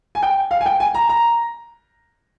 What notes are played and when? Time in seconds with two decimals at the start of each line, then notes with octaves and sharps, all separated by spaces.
0.15 G#5
0.22 G5
0.51 F5
0.61 G#5
0.66 G5
0.80 G#5
0.94 A#5
1.09 A#5